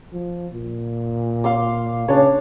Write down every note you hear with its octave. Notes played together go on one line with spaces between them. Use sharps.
F3
A#2
F5 C6 D6
C#3 D4 C#5